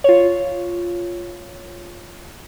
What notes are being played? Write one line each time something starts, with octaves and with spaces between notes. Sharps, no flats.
F4 C#5